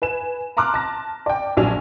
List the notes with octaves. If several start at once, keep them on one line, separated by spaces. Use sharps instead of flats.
B4 G#5 E7
A5 A#5 C6 D6 F6 F#6
A5 A#6
D5 G5
A#1 F#3 D4 G#5 F7